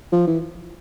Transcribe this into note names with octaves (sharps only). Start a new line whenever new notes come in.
F3
E3